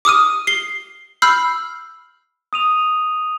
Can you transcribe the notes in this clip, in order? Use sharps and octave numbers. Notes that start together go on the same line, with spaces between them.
D6 D#6 F6 D#7
C7 G7
B5 E6 F6 G6 C7
D#6 D#7 F7